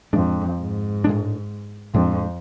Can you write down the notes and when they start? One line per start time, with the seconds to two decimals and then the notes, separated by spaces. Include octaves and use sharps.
0.13 F2 A2 G#3 D4
0.59 G#2
1.04 A2 G#3 D4
1.94 F2 A2 G#3 D4